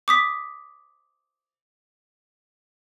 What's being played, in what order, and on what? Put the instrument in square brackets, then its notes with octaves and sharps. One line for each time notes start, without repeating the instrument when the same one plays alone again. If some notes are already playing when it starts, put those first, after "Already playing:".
[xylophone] D6 D#6 B6